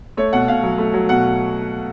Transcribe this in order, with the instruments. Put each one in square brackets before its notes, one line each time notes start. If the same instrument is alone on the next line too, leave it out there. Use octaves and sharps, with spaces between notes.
[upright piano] A3 C#5
B2 F#5
B2 F5
F#3
A3
F#3
B2 F#5